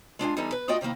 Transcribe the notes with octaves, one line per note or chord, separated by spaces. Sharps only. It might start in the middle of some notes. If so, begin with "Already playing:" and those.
G#3 D4 F4 G#5
E2 G3 D#4 A4 G#5
B4
A3 F4 F#4 D5 D#5 G5
C3 D#3 G3 A#3 E4